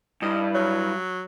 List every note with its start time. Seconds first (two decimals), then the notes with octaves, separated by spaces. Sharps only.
0.22 G2 E4 D#5
0.55 F#3 C#5